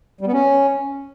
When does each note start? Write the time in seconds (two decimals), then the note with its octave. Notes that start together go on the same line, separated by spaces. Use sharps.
0.21 G3
0.26 B3
0.32 C#4